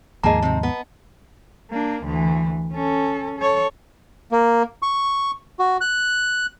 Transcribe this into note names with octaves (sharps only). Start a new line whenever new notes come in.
D#2 G#2 F3 A#3 G#4 D#5 A5 A#5
C3 C4
B3
A#3 D4
D2 E3
C#4 A4
A4 C#5
A#3
C#6
F#4
F#6